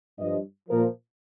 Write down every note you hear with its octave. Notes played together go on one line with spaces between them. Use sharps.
G2 F3 D#5
A#2 F3 A#4